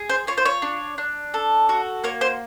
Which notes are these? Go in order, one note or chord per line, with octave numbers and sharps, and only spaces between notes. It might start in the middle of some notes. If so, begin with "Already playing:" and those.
Already playing: G#4
C5
F4 C#5
C5
C#5
D4
D4
A4
F#4
A#3 C#5
C5